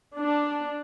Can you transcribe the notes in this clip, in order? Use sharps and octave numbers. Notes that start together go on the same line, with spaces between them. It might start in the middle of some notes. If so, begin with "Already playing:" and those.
D4